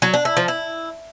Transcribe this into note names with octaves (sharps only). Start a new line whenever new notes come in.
F#3
D4
E4
F3
E4